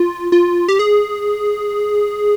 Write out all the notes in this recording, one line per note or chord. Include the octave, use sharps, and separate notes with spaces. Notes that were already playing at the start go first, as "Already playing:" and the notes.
Already playing: F4
F4
G4
G#4